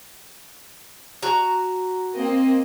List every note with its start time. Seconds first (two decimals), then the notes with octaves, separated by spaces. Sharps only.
1.23 F#4 A#5
2.14 A#3 C4 D#5